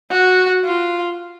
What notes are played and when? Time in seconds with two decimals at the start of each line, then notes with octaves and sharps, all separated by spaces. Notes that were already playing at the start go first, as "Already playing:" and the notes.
0.11 F#4
0.65 F4